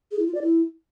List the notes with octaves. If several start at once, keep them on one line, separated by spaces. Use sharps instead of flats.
G#4
E4
F4
D5
E4